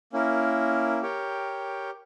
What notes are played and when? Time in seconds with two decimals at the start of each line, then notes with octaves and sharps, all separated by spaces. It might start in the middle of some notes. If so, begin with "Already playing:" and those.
0.13 A#3 C#4 E4 A#4
1.02 G4 A#4 C#5 G5